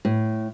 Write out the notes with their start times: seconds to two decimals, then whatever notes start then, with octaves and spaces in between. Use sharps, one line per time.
0.05 A2